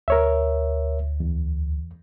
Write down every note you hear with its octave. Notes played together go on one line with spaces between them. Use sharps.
D2 A#4 C#5 E5
E2